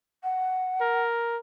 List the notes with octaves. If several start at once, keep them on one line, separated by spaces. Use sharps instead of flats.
F#5
A#4